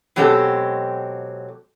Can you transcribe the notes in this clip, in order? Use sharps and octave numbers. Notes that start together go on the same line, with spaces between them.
B2 F#3 G#3 C4 G4 A4